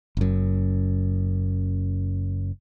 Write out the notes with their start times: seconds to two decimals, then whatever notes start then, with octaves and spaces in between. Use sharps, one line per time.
0.17 F#1 F#2